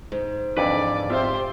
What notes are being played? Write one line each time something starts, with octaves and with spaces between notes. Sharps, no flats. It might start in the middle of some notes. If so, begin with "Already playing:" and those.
G#2
F2 D3 E3 B4 D5
C4 F4 G4 C5 E5